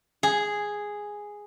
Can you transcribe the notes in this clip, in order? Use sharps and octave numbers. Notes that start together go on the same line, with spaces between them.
G#4